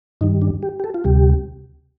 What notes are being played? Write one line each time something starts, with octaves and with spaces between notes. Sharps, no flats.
G2 D#3 G3 D#4
D4
G4
G4
A4
F4
D2 C3 G3 G4